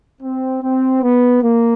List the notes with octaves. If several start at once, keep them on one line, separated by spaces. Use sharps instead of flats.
C4
C4
B3
A#3